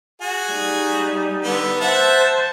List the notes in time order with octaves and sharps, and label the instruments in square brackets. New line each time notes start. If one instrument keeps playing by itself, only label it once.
[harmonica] F#4 G#4 G#5
[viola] G3 D#4
[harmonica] D3 B3
[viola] C5 A5 [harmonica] E5 F#5